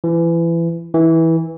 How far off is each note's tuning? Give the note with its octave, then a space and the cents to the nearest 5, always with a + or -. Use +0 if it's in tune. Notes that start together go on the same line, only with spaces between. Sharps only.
E3 +25
E3 -15